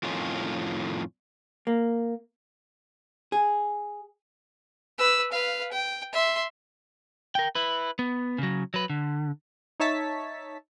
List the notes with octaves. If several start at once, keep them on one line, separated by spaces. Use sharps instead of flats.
F2 A2 D#3 C#4 F4
A#3
G#4
B4 E6
B4 F5
G5
E5 C6
A#4 G5
E4 B4
B3
C#3 F#3
F#3 B4
D3
D#4 C#5 E5 A5 B6